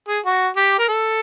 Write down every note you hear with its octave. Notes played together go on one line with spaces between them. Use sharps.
G#4
F#4
G4
A#4
A4